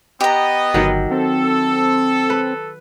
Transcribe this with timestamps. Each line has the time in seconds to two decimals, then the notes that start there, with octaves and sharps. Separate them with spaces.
0.21 B3 G4 D#5 A#5
0.74 G1 D#3 F#3
1.11 C4 A4
2.30 B4